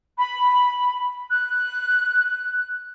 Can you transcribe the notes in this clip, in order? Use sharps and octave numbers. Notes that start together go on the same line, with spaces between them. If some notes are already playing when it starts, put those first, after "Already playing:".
B5
F#6